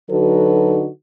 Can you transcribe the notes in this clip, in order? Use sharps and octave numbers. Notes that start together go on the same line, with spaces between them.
D3 F#3 D#4 F#4 A4 B4